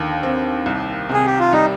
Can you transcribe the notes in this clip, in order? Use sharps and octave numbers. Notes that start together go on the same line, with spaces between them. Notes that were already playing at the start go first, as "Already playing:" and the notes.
Already playing: D#2 D3 F3
C4
C2
C3 G#4
G4
F4
G3 D#4